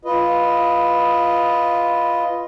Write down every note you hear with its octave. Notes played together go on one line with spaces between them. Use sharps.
F4 B4 D#5